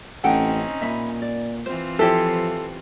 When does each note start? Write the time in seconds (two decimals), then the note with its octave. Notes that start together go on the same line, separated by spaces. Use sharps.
0.24 A1 C4 C#4 D#4 A4 F#5 G5
0.82 A#2 E5 B5
1.22 D5
1.66 E3 C4 F4 C5
1.99 F3 E4 G4 A4 C5